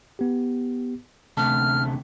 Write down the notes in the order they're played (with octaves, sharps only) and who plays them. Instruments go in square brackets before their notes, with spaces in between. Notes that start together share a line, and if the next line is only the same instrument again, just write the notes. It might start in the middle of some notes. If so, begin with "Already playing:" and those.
[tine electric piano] B3 G4
[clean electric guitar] D2 C3 A3 [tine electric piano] A5 F#6 [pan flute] F6